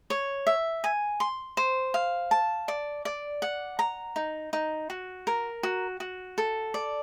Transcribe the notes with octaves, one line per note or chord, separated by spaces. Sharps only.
C#5
E5
G#5
C6
C5
F5
A5
D5
D5
F#5
A#5
D#4
D#4
F#4
A#4
F#4
F#4
A4
D5